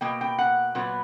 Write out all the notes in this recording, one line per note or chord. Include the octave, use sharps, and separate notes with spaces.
B2 A#3 G5
G5
F#5
A#2 F#3 B3